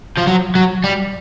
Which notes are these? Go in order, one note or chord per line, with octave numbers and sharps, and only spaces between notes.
F3
F#3
F#3
G3